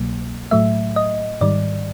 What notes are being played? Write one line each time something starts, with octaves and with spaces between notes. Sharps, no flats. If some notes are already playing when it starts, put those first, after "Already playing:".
Already playing: C2 B2 F#3 A#3
A2 F#3 A3 E5
D#5
G#2 D#3 G3 D5